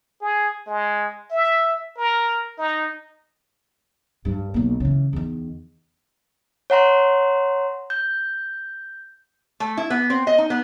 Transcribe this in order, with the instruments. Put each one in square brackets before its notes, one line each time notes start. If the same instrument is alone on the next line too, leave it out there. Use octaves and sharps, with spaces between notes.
[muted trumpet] G#4
G#3
E5
A#4
D#4
[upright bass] G2 G3
B1 A#3
C#3 E3
E2 D#3
[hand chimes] C#5 F#5 A#5 C6
G6
[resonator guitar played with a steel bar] A3
E4
B3
C4
D#5
D#4
B3